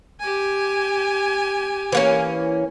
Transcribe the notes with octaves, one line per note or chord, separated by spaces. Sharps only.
G4 G#5
E3 A#3 C#4